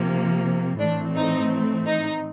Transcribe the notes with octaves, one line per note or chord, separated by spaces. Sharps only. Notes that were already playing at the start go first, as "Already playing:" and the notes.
Already playing: C3 F3 A#3
A2 E3 A3 C4 D4
D#4
D#4